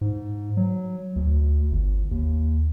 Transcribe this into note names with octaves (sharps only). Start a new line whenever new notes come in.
G#2
F#3
D2
G1
D#2